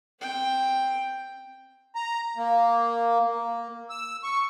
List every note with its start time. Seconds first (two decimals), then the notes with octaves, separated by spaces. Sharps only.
0.20 C4 G5
1.95 A#5
2.37 A#3
3.26 A#3
3.90 E6
4.23 C#6